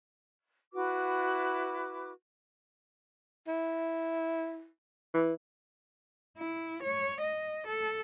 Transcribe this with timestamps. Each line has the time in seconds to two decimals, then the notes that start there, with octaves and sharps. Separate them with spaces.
0.73 E4 F#4 B4 D6
3.48 E4
5.14 E3
6.38 E4
6.83 C#5
7.21 D#5
7.67 A4